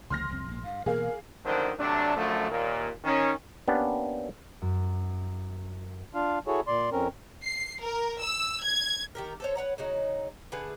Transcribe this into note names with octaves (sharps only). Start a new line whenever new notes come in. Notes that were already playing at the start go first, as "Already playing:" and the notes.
C#2 D3 F3 C6 F6 A#6
C2 F2 C4
A#1 G#2 A#3
G2 F5
B2 E3 A#3 G#4 A#4 F5
A#1 F#2 D3 D#3 D4 C5
C3 F#3 A3 D4
F#2 D3 F3 A3
D#2 A#2
D#3 C#4
A#3 B3 C#4 D4 G4
F#2
D4 F4 F5
E4 F#4 G#4 A4 C#5
A#2 D5 C6
F2 C4 C#4 A#4
C7
A#4
E6
G#6
D#3 G4 A#4
A4 C5 C#5
B4 C#5 F#5 A#5
C#3 F#3 D#4
D3 A3 G#4 B4